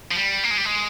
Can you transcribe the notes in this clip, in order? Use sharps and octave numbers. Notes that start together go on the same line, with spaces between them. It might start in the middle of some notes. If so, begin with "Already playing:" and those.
F3
G3
A#3
G#3
G3
G#3